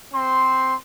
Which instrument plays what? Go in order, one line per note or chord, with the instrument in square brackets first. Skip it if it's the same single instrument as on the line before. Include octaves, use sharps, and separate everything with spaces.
[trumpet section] C4 C5 C6